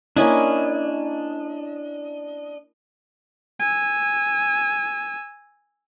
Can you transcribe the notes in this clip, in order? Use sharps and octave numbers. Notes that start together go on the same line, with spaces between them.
A#3 C#4 D4 E4 D#5
G#5 E6